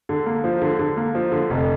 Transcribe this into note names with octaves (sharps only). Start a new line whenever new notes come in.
D3
A#3
F3
D3
D3
A#3
F3
D3
F1